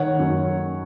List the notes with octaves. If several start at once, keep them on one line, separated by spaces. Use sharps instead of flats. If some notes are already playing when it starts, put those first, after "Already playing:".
Already playing: D#3 C#5 F#5
F#2